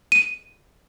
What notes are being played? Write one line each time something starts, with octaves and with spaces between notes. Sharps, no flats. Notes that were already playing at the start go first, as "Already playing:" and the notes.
D#7